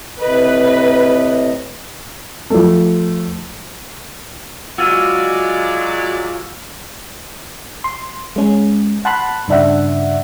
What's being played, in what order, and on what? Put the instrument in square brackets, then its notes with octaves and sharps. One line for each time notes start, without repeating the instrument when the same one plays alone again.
[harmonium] A2 C3 D#5 [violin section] B4
[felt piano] F3 A3
[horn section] F#3 G#3 D5 [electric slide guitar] F4 F#4 [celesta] E6 F6 D#7
[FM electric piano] C6
G#3 C#4
F#5 A5 B5 C6 F#6
G2 C#3 D4 E5 F#5